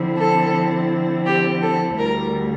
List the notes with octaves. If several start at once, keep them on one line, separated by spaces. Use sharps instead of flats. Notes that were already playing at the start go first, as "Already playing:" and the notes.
Already playing: D3 F3 C4 E4
A4
G4
A4
D2 D3 G3 A#4